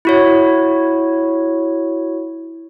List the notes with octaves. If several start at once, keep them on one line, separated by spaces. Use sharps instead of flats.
E4 F#4 C#5